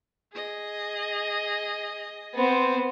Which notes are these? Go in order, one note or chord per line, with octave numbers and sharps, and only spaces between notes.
G#4 D#5
B3 C4 C5